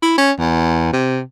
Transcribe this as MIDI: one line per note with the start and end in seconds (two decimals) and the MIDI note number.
0.02 0.14 64
0.18 0.32 61
0.39 0.90 40
0.93 1.21 48